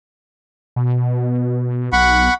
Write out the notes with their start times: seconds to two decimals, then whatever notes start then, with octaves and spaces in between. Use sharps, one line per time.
0.76 B2
1.93 B1 F#5 B5 C#6